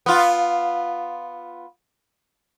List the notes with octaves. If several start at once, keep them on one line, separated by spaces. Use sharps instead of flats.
B3 F4